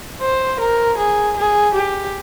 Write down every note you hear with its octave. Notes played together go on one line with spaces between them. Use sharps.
C5
A#4
G#4
G#4
G4